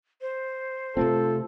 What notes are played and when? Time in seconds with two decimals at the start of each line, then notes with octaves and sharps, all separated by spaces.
0.21 C5
0.97 C3 A3 C4 F4 A4